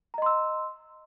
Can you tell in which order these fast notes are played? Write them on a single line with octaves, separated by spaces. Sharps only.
A#5 D#5 C6 E6